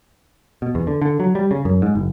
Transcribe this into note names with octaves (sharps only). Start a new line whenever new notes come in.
B2
E2
D3
D3
F#3
G3
C#3
F#2
G#2
F#1